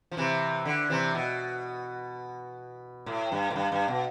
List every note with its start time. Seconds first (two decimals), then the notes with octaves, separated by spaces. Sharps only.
0.11 F3
0.17 C3 E3
0.65 D3
0.90 C3 E3
1.14 B2
3.06 A2
3.32 G2
3.50 A2
3.56 G2
3.72 G2
3.88 B2